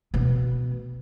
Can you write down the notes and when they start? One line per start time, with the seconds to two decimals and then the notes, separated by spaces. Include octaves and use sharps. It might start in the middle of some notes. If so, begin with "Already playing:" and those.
0.14 B2 B3